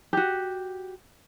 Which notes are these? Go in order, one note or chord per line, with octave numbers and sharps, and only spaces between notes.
F#4 G4